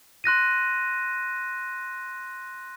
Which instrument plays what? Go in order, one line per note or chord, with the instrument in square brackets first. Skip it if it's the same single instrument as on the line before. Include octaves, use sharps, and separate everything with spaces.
[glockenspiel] C6 F#6 A#6 D#7